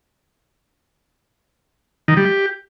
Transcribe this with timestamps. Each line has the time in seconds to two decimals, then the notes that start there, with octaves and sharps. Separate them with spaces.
2.08 D#3
2.17 G3
2.25 G4